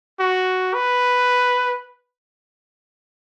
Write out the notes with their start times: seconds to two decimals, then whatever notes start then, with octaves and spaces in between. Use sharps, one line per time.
0.20 F#4
0.74 B4